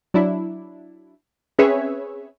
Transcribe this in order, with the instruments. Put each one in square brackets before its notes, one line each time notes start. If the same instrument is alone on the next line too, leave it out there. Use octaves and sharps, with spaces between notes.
[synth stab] F#3 D4 E4
C4 C#4 G#4 B4 C#5 E5